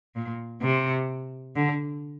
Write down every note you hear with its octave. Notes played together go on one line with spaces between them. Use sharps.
A#2
C3
D3